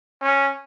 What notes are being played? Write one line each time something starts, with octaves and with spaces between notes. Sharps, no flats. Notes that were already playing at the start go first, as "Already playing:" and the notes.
C#4